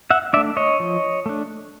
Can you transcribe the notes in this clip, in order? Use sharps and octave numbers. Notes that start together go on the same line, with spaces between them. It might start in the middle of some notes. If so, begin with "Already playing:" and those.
E5 F#5
A3 D4 D5 E5
C#5 D#5
F3
A3 D4